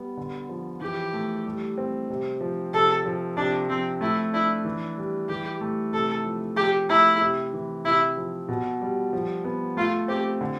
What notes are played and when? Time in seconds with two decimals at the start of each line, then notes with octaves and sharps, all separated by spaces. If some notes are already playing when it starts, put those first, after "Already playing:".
Already playing: G3 B3
0.17 D3
0.49 F3
0.81 E3 G4
1.13 A3
1.46 G3
1.78 C4
2.10 C3
2.41 F3
2.73 C3 A4
3.06 F3
3.37 C3 D4
3.69 F3 C4
4.01 A3 E4
4.33 D4 E4
4.65 E3
4.97 G3
5.28 E3 G4
5.61 A3
5.93 C3 A4
6.25 F3
6.56 F3 G4
6.89 A3 E4
7.21 C3
7.53 E3
7.85 C3 E4
8.17 F3
8.49 B2
8.81 G3
9.13 F3
9.44 B3
9.77 A3 F4
10.08 C4 G4
10.41 D3